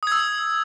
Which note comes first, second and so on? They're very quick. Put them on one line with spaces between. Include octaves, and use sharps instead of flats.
D#6 G#6 E6